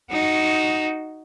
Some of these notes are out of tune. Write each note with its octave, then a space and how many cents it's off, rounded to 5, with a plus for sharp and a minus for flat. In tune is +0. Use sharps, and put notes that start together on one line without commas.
D#4 +0 F#4 +10